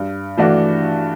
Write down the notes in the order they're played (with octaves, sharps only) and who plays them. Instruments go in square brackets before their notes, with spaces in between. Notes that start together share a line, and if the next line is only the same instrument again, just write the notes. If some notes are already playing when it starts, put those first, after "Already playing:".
Already playing: [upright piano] G2
E3 A3 D4 F#4